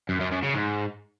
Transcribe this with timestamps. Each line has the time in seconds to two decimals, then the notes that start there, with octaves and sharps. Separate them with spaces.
0.09 F#2
0.20 F#2
0.32 F#2
0.43 C#3
0.55 G#2